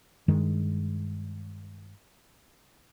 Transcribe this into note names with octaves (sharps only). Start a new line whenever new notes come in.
G2 D#3 G#3